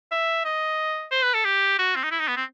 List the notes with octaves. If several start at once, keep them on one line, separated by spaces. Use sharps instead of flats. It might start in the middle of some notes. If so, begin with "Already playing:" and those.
E5
D#5
C5
B4
A4
G4
F#4
C4
D#4
E4
D#4
B3
C4